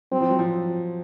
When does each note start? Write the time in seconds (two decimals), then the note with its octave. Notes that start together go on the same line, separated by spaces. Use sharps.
0.12 F#3 C4
0.21 F3
0.30 F#3
0.39 F3